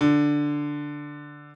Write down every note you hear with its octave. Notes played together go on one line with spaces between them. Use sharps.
D3